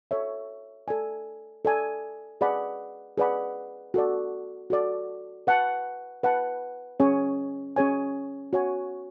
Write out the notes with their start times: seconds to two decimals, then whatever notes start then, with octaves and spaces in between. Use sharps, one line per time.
0.11 A4 C#5 E5
0.88 A4 D5 G#5
1.65 A4 D5 G#5
2.41 G#4 B4 D5 F#5 B5
3.18 G#4 B4 D5 F#5 B5
3.94 F#4 A4 D5
4.70 F#4 A4 D5
5.47 B4 F#5 A5
6.23 B4 F#5 A5
7.00 C#4 G#4 C#5 G#5
7.76 C#4 G#4 C#5 G#5
8.53 F#4 C#5 G#5